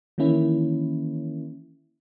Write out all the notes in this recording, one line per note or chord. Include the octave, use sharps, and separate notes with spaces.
D#3 E3 A#3 C#4 E4